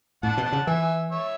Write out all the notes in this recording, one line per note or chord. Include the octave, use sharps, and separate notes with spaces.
A2 F#5 A5
B2
F#5 A5
C#3
E3 E5 G#5
C#5 E5